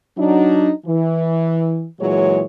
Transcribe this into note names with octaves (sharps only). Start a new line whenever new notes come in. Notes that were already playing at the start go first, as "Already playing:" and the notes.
F#3 D4 D#4
E3
A#2 E3 F#3 G#3 G#4 C#5